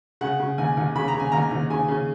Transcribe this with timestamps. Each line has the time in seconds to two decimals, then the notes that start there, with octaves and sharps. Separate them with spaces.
0.21 C#3 F#5
0.40 C#3
0.58 D#2 G#5
0.77 D#2
0.96 C#3 B5
1.08 A#5
1.14 C#3
1.20 G#5
1.32 D#2 A#5
1.51 D#2
1.70 C#3 G#5
1.88 C#3